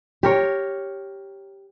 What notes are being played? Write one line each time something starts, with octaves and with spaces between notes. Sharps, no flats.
G4 A#4 C#5